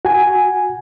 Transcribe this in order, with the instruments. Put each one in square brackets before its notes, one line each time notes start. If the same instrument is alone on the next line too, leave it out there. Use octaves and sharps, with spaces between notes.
[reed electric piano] F#4 G#5